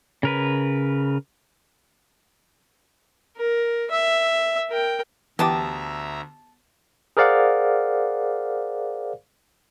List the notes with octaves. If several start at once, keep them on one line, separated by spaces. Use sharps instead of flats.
C#3 A#4 B4
A#4
E5
A#4 G5
D2 E3 B3 G4 E5 A5 A#5 D#6
G#4 A#4 C5 D5 F5 F#5